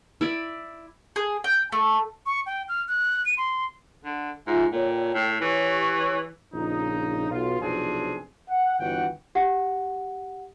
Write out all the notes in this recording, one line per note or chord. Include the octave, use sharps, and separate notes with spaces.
E4 D5
G#4
G5
A3
C#6
G5
F6
F#6
D#7
C6
D3
G#2 F4 E5 G#5
A#2 A4 C#5 G5
A2
E3 G4 C#5 C#6
A#1 F2 C#3 D#4
B1 F4
B1 F2 C3 C4 D4 G#4
F#5
G1 D3 E3 F#4 F#5 G5
G4 F#5